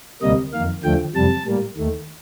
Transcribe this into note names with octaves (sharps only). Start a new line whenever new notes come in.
D2 C3 G3 A#3 D#5
F2 D#3 A#3 F5
D#2 D3 F3 A3 G5
F2 C3 G3 A5
A2 G3 A#3
D#2 D#3 A3